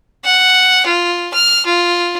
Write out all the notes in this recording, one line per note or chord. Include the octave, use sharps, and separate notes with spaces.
F#5
F4
F6
F4